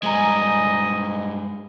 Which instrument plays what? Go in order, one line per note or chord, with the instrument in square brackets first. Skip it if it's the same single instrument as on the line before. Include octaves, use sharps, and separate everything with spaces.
[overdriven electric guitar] G2 G#3 [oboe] D#5 [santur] G#5 A#5 B5